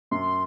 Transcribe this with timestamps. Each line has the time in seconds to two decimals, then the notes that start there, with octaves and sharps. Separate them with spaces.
0.11 F#2 C6